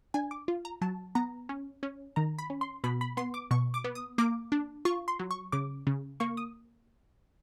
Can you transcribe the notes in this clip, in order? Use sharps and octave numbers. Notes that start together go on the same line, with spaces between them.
D4 G#5
D6
F4
A#5
F#3 A5
B3 A#5
C#4
C#4
D#3 A#5
B5
C#4
C6
B2 B5
B5
B3 C6
D6
B2 C#6
D6
B3
D#6
A#3 D6
D4
F4 C#6
C6
F#3
C#6
C#3 D6
C#3
A#3 C#6
D#6